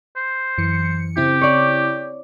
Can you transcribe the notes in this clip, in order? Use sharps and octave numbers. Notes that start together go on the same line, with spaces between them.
C5
F#2 E3 C#7
C#3 C4 E4 G4
C#5 D5